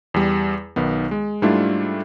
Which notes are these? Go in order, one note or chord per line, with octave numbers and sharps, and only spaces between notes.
E2 G3
B1 D#3 B3
G#3
G#2 G3 A3 D4 E4 F4